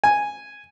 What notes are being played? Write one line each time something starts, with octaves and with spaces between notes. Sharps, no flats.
G#5